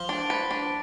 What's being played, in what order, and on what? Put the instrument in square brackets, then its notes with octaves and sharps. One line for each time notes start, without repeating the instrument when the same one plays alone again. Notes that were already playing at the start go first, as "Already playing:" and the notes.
Already playing: [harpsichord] F3
[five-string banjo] D4
B4
D4